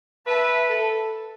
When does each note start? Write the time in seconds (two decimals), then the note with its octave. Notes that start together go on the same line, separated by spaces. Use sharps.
0.27 B4 E5 A5
0.69 A4